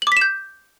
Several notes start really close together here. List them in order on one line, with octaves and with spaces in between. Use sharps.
F#7 D6 B6 E7 G6